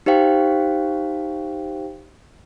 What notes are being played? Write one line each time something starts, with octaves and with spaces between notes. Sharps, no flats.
D#4 G4 C5 F5 G5